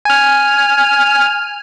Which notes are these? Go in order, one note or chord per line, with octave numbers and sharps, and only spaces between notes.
G#5 F6